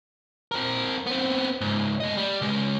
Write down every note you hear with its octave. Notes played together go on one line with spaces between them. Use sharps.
C4 A#4
B3 C4
C#2 G#2
A3 D#5
G3
C#3 G#3